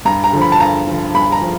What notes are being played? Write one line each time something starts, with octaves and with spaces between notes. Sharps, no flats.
G2 A#5
A#5
D3 F3
B5
A5
G2 A#5
D3 F3
G2 B5
A#5
F3